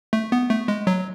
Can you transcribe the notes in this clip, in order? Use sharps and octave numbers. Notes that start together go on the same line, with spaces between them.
A3
B3
A3
G#3
F#3